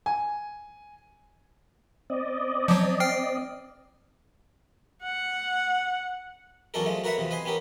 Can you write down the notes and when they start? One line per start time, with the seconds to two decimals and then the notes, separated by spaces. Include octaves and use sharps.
0.06 G#5
2.10 C4 D5 D#5
2.68 F3 F#3
3.00 G5 F6 C7
5.03 F#5
6.74 E2 F#3 C#4 D4 A4 A#4
6.86 F3 G#3 A3
7.04 F#4 A#4 B4 C#5 E5 F#5
7.17 E2 C3 F3
7.31 B4 D#5 G#5 C6
7.45 B3 C#4 G4 A#4